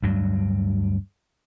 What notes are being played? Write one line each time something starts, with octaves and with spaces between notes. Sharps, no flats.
D2 G2 F#3